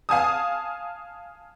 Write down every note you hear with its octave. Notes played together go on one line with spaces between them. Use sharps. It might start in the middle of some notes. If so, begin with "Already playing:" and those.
F5 G#5 A5 D#6